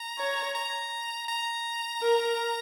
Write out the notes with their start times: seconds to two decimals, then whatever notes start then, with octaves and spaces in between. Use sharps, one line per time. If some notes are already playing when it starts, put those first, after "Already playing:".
Already playing: A#5
0.18 C#5
0.55 A#5
1.28 A#5
2.01 A#4